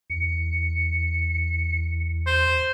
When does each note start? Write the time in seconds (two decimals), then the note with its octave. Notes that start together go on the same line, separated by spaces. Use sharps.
0.10 E2 C#7
2.27 C5